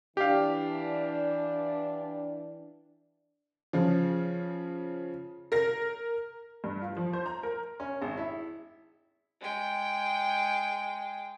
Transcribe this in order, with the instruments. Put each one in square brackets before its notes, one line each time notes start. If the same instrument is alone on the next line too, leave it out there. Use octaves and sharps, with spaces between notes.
[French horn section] E3 D4 [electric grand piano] G4 F5
[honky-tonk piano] C#3 F3
A#4 A#6
G2
F4
F3
C5
A#5
A#4
[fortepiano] C#4
G#1
E4
[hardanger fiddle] G#3 G5